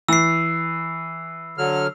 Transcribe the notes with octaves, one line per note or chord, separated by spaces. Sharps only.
E3 E6 C7
D3 F#3 F6